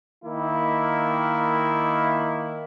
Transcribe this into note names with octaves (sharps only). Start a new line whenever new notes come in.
D#3 A#3 E4